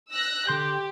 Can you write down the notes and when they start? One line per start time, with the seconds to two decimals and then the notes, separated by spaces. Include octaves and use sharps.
0.10 E6 F#6 A#6
0.47 D3 G4 C6 G6